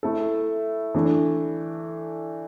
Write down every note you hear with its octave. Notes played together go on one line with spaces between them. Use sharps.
A3 E4 A4
E3 A3 D4